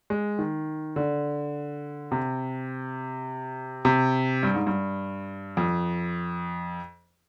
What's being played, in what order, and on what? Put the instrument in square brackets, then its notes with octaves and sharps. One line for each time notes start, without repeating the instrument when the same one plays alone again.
[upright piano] G#3
D#3
D3
C3
C3
G2
G#2
G2
F2